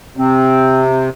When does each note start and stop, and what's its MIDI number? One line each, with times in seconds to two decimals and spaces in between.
0.17 1.09 48
0.17 0.88 60